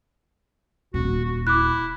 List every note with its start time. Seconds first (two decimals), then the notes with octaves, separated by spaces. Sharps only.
0.94 D#1 F#4
1.24 F#4
1.47 E4 D6 F#6